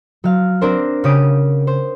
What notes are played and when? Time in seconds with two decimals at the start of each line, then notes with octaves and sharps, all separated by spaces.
0.24 F#3 F5
0.61 C4 D4 A#4 C5
1.04 C#3 G4 D#6 D7
1.67 C5